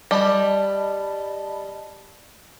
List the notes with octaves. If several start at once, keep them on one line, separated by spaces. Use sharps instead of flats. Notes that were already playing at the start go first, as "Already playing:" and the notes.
G3 D#5 A5 B5